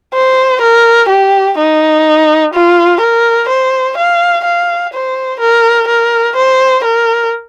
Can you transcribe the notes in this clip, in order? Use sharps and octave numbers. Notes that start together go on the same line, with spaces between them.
C5
A#4
G4
D#4
F4
A#4
C5
F5
F5
C5
A#4
A#4
C5
A#4